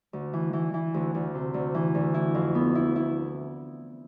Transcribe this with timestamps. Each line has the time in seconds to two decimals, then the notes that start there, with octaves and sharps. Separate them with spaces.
0.13 D2
0.33 E3
0.53 E3
0.74 E3
0.94 D2
1.15 D2
1.34 C3
1.54 D2
1.75 E3
1.95 D2
2.14 E4
2.35 F2
2.55 B3
2.75 E4
2.96 E4